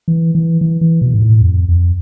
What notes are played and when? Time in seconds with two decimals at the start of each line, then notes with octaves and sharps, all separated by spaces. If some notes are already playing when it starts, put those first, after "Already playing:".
0.08 E3
0.35 E3
0.61 E3
0.81 E3
1.02 B2
1.14 G#2
1.22 A2
1.41 F2
1.69 F2